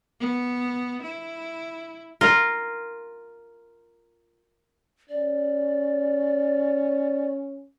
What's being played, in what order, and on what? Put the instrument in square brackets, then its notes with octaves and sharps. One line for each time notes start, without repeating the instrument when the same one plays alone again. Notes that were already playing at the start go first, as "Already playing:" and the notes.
[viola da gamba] B3
E4
[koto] F4 [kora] A#4
[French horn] C#4 [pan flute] D5